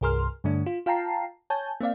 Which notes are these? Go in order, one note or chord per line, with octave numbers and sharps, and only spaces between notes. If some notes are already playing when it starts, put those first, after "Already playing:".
C2 G2 G#4 A#4 C6 F6
G2 D3 A3 D4
F4
F4 F5 G5 A5 A#5 C7
C#5 G#5 A5 G6
A#3 C4 D5 F5